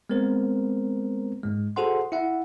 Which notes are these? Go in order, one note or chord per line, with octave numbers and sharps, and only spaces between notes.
G#3 B3 C4 A#4 C5
G#2 G#3
F#4 G#4 A4 C5 F#5 C6
E4 E5 F#5